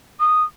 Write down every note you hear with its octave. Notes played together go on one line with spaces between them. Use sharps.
D#6